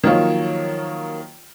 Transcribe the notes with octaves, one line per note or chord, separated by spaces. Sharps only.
D#3 F3 F#3 A#3 F4 C#5